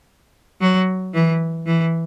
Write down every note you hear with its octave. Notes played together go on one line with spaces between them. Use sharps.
F#3
E3
E3